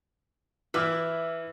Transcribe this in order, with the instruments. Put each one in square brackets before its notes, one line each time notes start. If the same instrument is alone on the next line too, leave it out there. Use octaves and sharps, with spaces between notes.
[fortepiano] E3 D6 F6 [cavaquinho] E4 E5